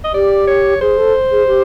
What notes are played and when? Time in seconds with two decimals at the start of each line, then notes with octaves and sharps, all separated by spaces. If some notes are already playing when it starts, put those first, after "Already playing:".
0.04 D#5
0.14 G4 D5
0.47 C#5
0.81 G#4 C5
0.98 A4
1.31 G#4
1.47 G4